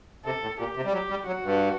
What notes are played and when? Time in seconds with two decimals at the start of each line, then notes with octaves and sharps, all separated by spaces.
0.25 C3 A4
0.42 A2
0.59 A#2 G4
0.76 C3
0.85 G3
0.93 F#3 G4
1.10 G3
1.27 F#3 F#4
1.44 G2